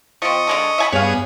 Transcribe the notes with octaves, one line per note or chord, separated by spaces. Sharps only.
F3 C4 D#5 C#6
D3 G#3 A4
E5 G#5 B5
G2 B3 G#4 C#5 F5